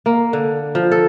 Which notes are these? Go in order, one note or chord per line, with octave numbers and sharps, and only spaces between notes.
A#3
D3
F3
A4